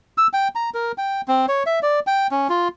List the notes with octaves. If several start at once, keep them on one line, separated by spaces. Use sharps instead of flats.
E6
G5
A#5
A#4
G5
C4
C#5
E5
D5
G5
C#4
F4